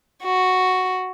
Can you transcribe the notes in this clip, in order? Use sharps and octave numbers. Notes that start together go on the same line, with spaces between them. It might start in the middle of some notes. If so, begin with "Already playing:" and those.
F#4